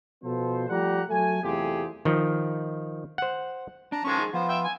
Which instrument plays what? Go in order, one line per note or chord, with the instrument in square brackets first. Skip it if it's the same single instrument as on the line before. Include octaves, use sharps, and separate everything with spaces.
[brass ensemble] B2 F3 B3 A4 C5
F3 G3 A3 G4 F#5 A#5
F#3 A3 A4 G#5
E2 C3 A3 F4 G4 G#4
[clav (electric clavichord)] D#3 F3
C5 F#5
[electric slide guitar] D4 [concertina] A5 A#5
[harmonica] D#3 F3 G#3 [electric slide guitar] C#4 A4 [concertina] C#6
[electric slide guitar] D#4 G#4
[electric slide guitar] F3 [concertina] B3 F4 [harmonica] C5
[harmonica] E5 G5
G#5